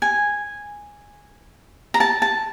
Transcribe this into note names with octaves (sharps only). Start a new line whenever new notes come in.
G#5
A#5
A5
A5